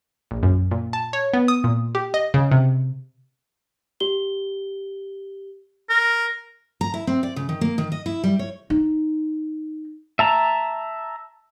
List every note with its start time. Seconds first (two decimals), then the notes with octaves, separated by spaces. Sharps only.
0.31 A#1
0.43 F#2
0.71 A#2
0.93 A5
1.13 C#5
1.34 B3
1.48 D#6
1.64 A#2
1.95 G4
2.14 D#5
2.34 C#3
2.51 C3
4.00 G4 G7
5.90 A#4
6.81 A#5
6.94 E4
7.07 C4
7.23 D5
7.36 C#3
7.49 D#3
7.61 A#3
7.78 D#3
7.92 D#5
8.06 E4
8.24 G3
8.39 C#5
8.70 D#4
10.19 E5 A5 A#5